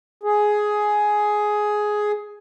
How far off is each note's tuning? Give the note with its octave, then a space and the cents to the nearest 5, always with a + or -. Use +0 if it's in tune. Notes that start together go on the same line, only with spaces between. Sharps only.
G#4 +10